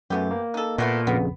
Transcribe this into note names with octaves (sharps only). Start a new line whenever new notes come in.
F#2 E3 A3 B3 G4
A#3
D#4 A4
A#2 A3 B3 E4
A#1 F2 C#3 B3